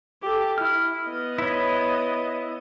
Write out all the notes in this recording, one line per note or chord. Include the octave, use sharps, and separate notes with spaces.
G4 A4
E4 F6
B3 D#5
E4 C#5